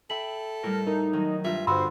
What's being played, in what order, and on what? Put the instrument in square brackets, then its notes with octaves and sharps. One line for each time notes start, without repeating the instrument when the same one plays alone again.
[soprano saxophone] A4 [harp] E5 G5 B5 [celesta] F#7
[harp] A2 G3 [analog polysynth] A#4
[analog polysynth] D#4 [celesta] A#4
[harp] D#3 F#3
[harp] G2 F4 [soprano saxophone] E5
[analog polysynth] G2 C5 [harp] D3 [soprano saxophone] F#4 [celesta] B5 C6 E6